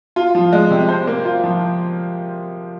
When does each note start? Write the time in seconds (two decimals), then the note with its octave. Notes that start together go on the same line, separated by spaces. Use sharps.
0.16 F4
0.35 F3
0.53 G#3
0.70 C3
0.89 C5
1.07 A#3
1.25 F4
1.43 F3